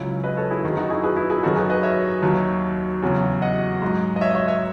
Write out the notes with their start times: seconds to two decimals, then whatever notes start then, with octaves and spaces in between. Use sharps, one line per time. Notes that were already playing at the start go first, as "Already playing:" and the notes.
Already playing: C#2 C#3 F#3 C#4 E4
0.24 B4 D#5
0.37 A4 C#5
0.50 E4 G#4
0.63 F#2 D#3 F#3
0.77 D#4 F#4
0.90 E4 G#4
1.04 G#4 B4
1.16 E4 G#4
1.30 E4 G#4
1.43 F#2 D#3 F#3 F#4 A4
1.56 G#4 B4
1.70 B4 D#5
1.83 C#5 E5
2.22 D#2 D#3 F#3
3.02 E2 C#3 F#3
3.42 D#5 F#5
3.82 G#2 F#3
4.16 D#5
4.21 C#5 E5
4.30 D#5
4.35 C#5 E5
4.48 C#5 E5